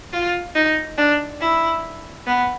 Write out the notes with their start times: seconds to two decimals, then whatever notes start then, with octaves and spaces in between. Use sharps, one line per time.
0.13 F4
0.55 D#4
0.98 D4
1.40 E4
2.26 B3